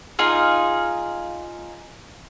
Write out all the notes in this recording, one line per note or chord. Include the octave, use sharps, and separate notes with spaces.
D#4 F4 G#4 F5